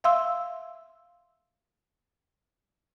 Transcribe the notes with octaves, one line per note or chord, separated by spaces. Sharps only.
E5 F5 C6 E6